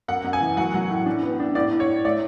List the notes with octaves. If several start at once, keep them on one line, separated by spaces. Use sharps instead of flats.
F#2 F#5
F#2
G#5
E3
F#3 F#5
F#3
A2
D4
B3
D4
A2 D5
A2
C#5
A2
A3 D5